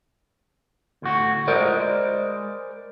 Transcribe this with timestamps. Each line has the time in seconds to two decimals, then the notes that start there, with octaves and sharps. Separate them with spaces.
1.02 D2 A2 F#4
1.48 G#3 A#4 C5 D5